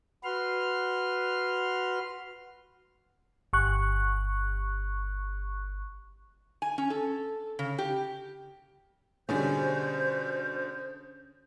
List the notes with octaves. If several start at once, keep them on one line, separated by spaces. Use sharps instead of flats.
F#4 B4 C6 F6
G1 C#6 F#6
G#5
C#4
A4
C#3
G4
B2 D3 G3 C#4 G#4 C5 G6